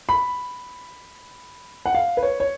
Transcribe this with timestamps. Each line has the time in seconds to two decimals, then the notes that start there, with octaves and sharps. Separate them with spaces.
0.09 B5
1.85 F#5
1.94 F5
2.17 B4
2.23 C#5
2.40 C#5